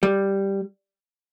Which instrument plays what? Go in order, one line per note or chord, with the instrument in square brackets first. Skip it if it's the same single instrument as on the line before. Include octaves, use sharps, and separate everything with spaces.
[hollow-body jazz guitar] G3